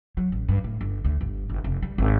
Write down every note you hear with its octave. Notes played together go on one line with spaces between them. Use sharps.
F#3
A1
G2
A2
G1
D2
G1
G1
F1
G3
G#1